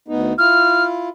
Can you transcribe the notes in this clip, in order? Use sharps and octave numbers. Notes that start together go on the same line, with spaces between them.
D2 B3 D#4
E4 F4 F6